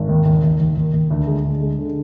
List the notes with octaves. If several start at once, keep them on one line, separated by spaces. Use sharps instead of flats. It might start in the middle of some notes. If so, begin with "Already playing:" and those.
Already playing: G#1
D#2
D#2
D#2
D#2
D#2
D#2
D2
G#3
D2
G#3
D3